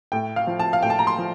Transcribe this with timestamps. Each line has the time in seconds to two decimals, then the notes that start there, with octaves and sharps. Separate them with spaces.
0.12 A2 G5
0.36 F5
0.47 F3
0.59 A5
0.73 F5
0.83 A2 G5
0.90 A5
0.99 A#5
1.07 C6
1.18 F3